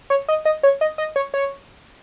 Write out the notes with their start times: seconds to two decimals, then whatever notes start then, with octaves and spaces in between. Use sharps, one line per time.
0.10 C#5
0.28 D#5
0.45 D#5
0.63 C#5
0.81 D#5
0.98 D#5
1.16 C#5
1.34 C#5